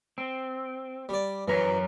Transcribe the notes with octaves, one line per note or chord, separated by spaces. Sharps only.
C4
G3 D5
F#2 E3 A#4 C#5